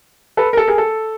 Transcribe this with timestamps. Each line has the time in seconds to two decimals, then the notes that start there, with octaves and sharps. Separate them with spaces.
0.37 A4 B4
0.53 A#4
0.57 A4
0.67 G#4 A#4
0.78 A4